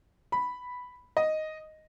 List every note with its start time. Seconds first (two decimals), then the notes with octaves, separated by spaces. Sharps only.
0.32 B5
1.17 D#5